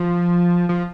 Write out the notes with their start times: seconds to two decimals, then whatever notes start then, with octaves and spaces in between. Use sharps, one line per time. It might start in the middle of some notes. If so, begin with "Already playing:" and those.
Already playing: F3
0.69 F3